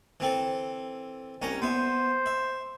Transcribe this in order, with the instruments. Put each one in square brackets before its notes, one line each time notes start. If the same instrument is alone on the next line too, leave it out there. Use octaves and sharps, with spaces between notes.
[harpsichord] E3 C4 A4
C2 C#4 A#5
[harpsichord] B3 E5 [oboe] C5
[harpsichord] E5